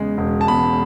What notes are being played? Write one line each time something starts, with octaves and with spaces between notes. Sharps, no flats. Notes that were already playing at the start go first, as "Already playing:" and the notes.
Already playing: E2 C#3 G#3
E1
A5
E2 B5